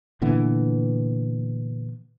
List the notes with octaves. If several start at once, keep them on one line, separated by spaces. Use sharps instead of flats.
A#2 D3 E3 B3